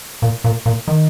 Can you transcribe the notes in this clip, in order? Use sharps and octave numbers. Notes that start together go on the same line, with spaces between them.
A#2
A#2
A#2
D#3